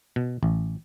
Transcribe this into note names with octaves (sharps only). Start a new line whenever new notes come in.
B2
A1